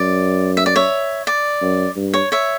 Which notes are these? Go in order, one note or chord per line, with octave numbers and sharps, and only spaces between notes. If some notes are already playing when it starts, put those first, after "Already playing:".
Already playing: F#2 D5
E5
D5
C#5 E5
D5
F#2
G2
C#5
C#5 E5